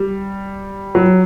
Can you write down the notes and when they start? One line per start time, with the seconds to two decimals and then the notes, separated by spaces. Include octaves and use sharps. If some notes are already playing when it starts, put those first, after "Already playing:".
Already playing: G3
0.95 F#3